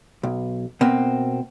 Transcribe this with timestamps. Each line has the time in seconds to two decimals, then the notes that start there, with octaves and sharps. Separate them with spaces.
0.23 B1
0.81 B2 A#3 C4